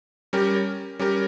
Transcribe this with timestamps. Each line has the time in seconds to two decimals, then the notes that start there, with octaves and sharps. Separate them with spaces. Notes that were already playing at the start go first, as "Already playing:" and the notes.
0.33 G3 C#4 G4 A#4
0.99 G3 C#4 G4 A#4